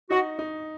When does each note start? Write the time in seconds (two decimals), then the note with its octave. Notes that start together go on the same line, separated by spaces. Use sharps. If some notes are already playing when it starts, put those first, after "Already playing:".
0.10 D#4 F#4
0.39 D#4